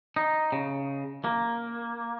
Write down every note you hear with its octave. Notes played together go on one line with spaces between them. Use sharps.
D#4
C#3
A#3